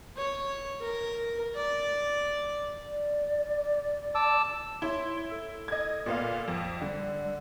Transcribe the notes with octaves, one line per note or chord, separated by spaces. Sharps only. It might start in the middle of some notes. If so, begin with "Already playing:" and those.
C#5
A#4
D5
D5
A5 D6 E6
E4 C#5 C6
A4
D#5 G#6
A#2 B3 F5
F2
D3 G3